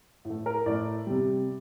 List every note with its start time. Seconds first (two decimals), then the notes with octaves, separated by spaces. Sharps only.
0.25 A2
0.30 A3
0.46 A#4
0.66 A2 A3 D5
1.07 C3 G3